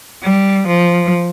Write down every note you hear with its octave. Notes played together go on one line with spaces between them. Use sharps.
G3
F3